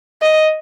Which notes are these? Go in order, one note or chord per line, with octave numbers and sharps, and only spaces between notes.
D#5